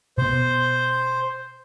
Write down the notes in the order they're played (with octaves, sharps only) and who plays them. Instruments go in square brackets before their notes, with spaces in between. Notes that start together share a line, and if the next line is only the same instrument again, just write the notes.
[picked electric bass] B2 B3 [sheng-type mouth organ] C5